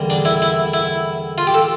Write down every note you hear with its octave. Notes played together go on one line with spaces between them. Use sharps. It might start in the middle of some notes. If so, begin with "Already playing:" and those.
Already playing: E2 D3 G3 A#3
D4
E4
E4
E4
F4
G4
A4